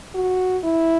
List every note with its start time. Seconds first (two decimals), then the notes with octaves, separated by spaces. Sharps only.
0.14 F#4
0.63 E4